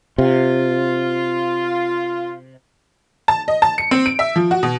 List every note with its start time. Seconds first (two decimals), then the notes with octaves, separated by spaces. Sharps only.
0.18 C3 F4
3.28 A5
3.48 D#5
3.62 A5
3.78 C#7
3.91 C4
4.06 D7
4.19 E5
4.36 F3
4.51 F#4
4.63 B2